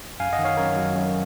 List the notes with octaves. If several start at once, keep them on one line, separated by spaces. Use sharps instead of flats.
F#2 F5 G#5
D#5 F#5
D#3
C#5 F5
F#2 A#4 C#5
F#3
F#2